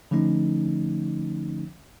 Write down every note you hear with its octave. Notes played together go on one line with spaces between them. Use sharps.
D3 F3 A3 C#4 D#4